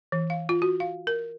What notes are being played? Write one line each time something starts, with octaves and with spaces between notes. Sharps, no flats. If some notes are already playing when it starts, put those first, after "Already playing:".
E3
F5
F4
F#4
F5
A#4